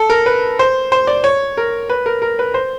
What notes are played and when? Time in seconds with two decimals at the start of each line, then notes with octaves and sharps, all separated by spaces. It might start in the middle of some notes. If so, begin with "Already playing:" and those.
Already playing: A4
0.10 A#4
0.26 B4
0.59 C5
0.92 C5
1.07 D5
1.24 C#5
1.57 A#4
1.90 B4
2.06 A#4
2.22 A#4
2.39 B4
2.54 C5